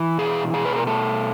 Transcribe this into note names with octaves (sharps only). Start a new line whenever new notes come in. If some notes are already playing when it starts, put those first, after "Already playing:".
Already playing: E3
B2 G#4
B2 G#4
B4
A#4
A3 A4